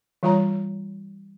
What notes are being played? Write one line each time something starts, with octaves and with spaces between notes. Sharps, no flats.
E3 G3 F4 C#5 A#5